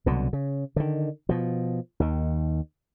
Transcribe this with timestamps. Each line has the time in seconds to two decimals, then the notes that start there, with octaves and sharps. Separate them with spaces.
0.06 C2 B2 D3 F#3
0.33 C#3
0.76 D3 D#3
1.29 B2 F3
2.00 D#2 D#3